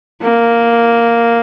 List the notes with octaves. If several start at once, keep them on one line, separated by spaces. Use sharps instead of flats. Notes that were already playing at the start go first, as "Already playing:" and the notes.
A#3